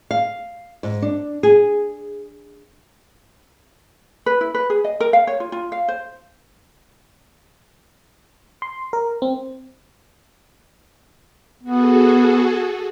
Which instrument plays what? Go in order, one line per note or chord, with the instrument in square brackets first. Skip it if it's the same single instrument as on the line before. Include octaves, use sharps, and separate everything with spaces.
[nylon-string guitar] F5
G#2
D4
G#4
[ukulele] B4
E4
B4
G#4
D#5
A#4
F5
C#5
F4
F4
F5
C5
[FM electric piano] C6
A#4
C4
[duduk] B3 [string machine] F#4 G#4 A4